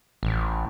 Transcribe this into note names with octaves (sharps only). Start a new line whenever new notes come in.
A1